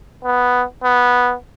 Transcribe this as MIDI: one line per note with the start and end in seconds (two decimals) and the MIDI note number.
0.24 0.64 59
0.84 1.34 59